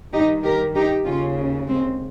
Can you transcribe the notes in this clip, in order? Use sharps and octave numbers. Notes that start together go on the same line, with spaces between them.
G2 D#3 D#4 G4
G4 A#4
D#4 G4
D#2 C#3 C#4 F4
G#3 C4